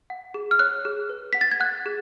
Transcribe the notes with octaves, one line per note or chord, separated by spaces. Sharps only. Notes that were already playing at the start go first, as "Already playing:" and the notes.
F#5
G#4
F6
C#5 F#6
G#4
B4
F#5 B6
A6
G#6
F#5 F#6
G#4